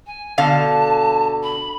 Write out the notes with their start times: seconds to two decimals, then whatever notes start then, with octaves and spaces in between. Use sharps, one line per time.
0.06 G#5
0.38 B2 D3 F5 A5
1.43 B5